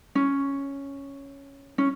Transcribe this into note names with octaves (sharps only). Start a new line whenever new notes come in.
C#4
C#4